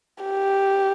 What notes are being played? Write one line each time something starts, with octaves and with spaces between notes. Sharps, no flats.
G4